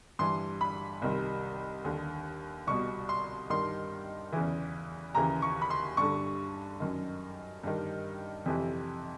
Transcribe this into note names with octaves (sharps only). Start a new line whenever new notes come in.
G2 E3 C6
B5
C2 C3 D#3
D#2 D3
C2 B2 C#6
C6
G2 D#3 C6
E2 C#3 E3
D#2 C#3 E3 A#5
C#6
B5
C6
G2 D3 C#6
F#2 D#3
G2 D#3
F2 C3 E3